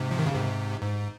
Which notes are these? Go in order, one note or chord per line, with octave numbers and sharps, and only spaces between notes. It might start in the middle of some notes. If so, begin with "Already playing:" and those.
Already playing: G#2 C3
F3
D#3
C#3
G#2 C3
G#2